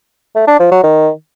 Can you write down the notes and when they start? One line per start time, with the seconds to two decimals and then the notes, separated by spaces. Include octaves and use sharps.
0.35 A3
0.47 D4
0.59 F3
0.71 F#3
0.83 D#3